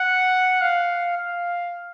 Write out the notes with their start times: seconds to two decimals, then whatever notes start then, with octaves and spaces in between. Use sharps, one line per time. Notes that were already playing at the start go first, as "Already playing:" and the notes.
Already playing: F#5
0.61 F5
1.17 F5